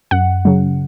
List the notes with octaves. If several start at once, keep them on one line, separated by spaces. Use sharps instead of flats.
F#2 F#5
C#3 F#3